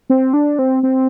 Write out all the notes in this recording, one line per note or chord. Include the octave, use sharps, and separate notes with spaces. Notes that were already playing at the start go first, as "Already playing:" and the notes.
C4
D4
C4
C4